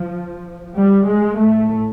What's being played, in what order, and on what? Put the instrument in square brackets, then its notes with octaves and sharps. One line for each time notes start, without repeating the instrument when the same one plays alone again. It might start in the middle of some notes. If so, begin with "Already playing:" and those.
Already playing: [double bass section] F3
G3
G#3
A2 A3